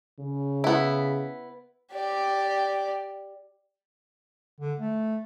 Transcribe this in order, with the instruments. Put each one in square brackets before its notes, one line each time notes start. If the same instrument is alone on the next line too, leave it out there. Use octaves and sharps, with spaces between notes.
[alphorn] C#3
[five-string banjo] B3 E4
[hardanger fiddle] G4 D5
[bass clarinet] D3
A3